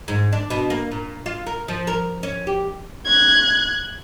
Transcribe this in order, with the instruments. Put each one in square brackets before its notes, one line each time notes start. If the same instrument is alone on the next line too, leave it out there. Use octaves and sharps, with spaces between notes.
[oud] G#2
D4
B2
A#3
A#2
F4
A#4
F3
A#4
C#4
G4
[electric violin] F#6 G#6